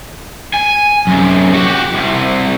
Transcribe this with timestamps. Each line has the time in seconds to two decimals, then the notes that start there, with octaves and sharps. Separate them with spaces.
0.54 G#5
1.07 F#2 C3
1.53 F#4 G4
1.94 C2 C3